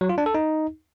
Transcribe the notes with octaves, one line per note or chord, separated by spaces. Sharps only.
F#3
F4
D4
A4
D#4